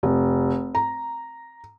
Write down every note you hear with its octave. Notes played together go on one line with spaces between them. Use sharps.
F1
A#5